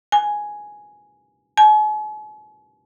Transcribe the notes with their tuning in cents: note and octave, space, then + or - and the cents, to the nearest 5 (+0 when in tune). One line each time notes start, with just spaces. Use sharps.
G#5 +5
G#5 +45